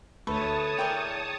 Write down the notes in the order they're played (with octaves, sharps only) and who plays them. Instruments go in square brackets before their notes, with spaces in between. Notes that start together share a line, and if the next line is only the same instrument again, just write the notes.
[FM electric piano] D2 A3 [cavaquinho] B4 [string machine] C#5 A5 D#6
[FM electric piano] E4 G#4 [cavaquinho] A#4 D5 G5